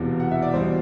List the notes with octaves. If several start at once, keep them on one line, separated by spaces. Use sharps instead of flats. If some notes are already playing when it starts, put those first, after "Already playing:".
Already playing: E1 E2 C3 E3
F#5
E5
D5
E2 B2 G3 C5